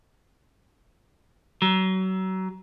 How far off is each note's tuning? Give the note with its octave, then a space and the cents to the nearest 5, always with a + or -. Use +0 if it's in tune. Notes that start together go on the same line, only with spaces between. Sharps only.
F#3 +30